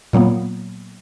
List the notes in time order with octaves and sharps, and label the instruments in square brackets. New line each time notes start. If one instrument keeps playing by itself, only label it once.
[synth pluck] A#2 F#3 A#3 B3